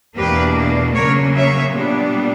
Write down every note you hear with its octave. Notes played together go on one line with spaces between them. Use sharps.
E2 B2 A#3 D4 G4 B4
C#3 F#3 A#3 A#4 C#5
C#5 E5
A#2 G3 B3 D4